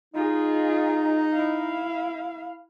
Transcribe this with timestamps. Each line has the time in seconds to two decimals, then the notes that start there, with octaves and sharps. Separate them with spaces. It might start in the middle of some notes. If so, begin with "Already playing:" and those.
0.15 D#4 F4 G#4
1.33 E4 F5